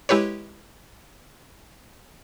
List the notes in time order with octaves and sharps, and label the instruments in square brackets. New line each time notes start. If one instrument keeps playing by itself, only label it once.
[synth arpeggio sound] G#3 E4 G4 B4 C#5